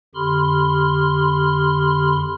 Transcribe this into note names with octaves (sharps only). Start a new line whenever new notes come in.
F2 D3 G4 B5 C6 F6